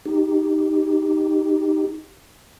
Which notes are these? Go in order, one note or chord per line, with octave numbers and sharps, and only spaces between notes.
D#4 G4